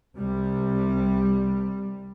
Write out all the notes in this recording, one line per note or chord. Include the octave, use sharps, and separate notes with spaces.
C2 C3 G3